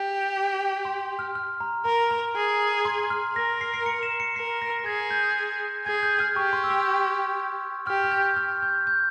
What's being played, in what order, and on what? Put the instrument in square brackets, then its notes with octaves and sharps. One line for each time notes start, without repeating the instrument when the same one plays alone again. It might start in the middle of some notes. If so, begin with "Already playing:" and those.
Already playing: [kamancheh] G4
[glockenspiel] C6
F6
F6
A#5
[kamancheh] A#4 [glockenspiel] A#5
[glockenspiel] A#5
[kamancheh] G#4
[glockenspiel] C6
F6
[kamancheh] A#4 [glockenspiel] A#6
[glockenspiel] C7
C7
C#7
E7
C#7
[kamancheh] A#4 [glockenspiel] C7
[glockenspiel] A#6
A#6
[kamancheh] G#4 [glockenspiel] G#6
[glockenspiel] G6
[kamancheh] G#4 [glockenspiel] G#6
[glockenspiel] G6
F6
[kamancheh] G4 [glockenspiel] C#6
[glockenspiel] C6
E6
C#6
[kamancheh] G4 [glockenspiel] F6
[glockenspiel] F6
G6
F6
G6
G6